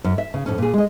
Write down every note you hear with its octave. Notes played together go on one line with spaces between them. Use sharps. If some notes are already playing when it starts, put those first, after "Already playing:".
F#2
E5
C#3
F2 A2 C#4
A#2 G#4
G#3 D#5